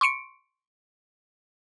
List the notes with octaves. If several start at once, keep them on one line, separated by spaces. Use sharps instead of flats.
C6 C#6 C#7 D7